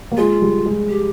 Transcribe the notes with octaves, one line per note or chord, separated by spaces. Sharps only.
A#3
G#3 F4
G3
G#3
G4